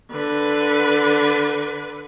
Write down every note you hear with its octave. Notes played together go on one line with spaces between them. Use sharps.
D3 B4